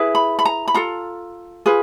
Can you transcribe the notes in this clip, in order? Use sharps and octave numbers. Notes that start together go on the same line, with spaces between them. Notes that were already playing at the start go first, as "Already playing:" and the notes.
Already playing: E4 G#4 B4
B5
B5
A#5
B5
F4 A4 A#5
F4 G#4 B4